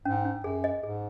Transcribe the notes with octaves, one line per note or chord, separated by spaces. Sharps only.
G#2 C#4
C#4
F#2 G#4
D#5
G#2 G#4